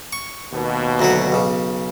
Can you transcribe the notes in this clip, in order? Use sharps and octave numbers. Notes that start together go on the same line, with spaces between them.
C#6
D#2 B2
D2 F#3 F#4
B1 C#3